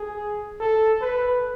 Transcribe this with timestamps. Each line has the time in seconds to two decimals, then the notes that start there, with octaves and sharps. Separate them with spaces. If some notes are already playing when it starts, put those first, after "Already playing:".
Already playing: G#4
0.60 A4
1.01 B4